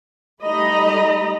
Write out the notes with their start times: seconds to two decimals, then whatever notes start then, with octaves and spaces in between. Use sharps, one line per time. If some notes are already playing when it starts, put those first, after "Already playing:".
0.44 G3 A3 D#4 D#5 A#5 B5